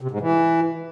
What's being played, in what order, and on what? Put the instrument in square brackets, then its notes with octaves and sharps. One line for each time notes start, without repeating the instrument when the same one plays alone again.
[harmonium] C3
G#2
E3